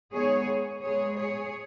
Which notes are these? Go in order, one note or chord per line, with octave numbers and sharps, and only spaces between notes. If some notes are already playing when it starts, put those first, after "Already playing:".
D#3 G#3 B3 G#4 C#5
B2 G#3 B3 G#4 C#5
G#4 C#5